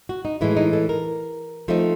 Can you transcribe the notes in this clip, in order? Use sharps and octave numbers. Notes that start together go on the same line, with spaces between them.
F#4
D#4
A2 E3 G#3 E4
D#4
A4
A#4
F3 A3 C4 D#4